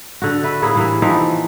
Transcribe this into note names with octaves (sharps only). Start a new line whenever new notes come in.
D3 F#4
B4 E5
A2 A#3 E4 G#4
A2 C3 E3 A#3
E3 F3 C4 D#4